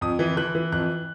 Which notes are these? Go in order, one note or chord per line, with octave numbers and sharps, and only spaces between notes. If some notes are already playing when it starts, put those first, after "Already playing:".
F2 D#6
E3
E3 F#6
E3
F2 F#6